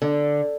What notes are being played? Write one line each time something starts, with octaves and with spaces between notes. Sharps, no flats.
D3